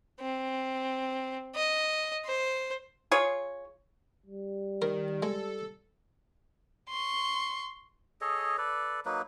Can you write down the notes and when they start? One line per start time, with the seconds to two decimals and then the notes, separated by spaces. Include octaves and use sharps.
0.20 C4
1.55 D#5
2.26 C5
3.11 F4 G#4 C#5
4.26 G3
4.82 D#3 A#4
5.23 G#3 A4
6.89 C6 C#6
8.21 G#4 A4 C#5 D#5
8.58 A4 B4 D5
9.06 F#3 A#3 D#4 B4